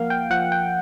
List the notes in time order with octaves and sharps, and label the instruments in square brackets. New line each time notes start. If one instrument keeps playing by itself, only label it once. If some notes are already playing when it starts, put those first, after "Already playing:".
Already playing: [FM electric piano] F3 A#3 F5 F#5
G5
F3 F#5
G5